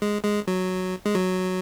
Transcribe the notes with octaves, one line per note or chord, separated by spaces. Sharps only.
G#3
G#3
F#3
G#3
F#3